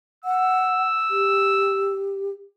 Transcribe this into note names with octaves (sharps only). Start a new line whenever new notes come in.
F#5 E6
G4